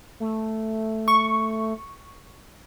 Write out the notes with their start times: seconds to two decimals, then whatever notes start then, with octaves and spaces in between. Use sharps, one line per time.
0.20 A3
1.08 C#6